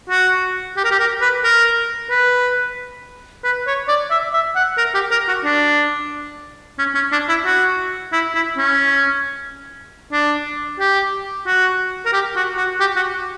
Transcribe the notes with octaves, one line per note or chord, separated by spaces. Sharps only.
F#4
G4
A#4
G4
A#4
B4
A#4
B4
B4
C#5
D5
E5
E5
F#5
A#4
G4
A#4
F#4
D4
C#4
C#4
D4
E4
F#4
E4
E4
C#4
D4
G4
F#4
A#4
G4
F#4
F#4
G4
F#4